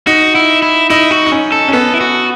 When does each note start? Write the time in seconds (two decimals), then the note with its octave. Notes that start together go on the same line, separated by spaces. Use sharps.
0.07 D#4 F#4
0.35 E4
0.62 E4
0.90 D#4 E4
1.11 F#4
1.26 D#4
1.32 C#4
1.52 A4
1.68 C#4
1.73 B3 A4
1.94 E4
2.01 F#4